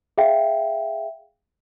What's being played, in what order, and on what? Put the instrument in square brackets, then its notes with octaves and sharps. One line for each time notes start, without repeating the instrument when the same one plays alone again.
[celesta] G#4 E5 F5 G5